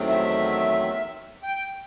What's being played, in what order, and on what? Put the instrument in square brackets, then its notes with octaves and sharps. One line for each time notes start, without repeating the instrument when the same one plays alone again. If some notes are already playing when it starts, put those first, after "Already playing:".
Already playing: [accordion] E2 D#3 F#3 A3 C4
E5
G5